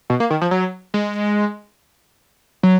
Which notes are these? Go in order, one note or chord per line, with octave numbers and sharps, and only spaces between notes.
B2
A#3
D#3
F3
F#3
G#3
F#3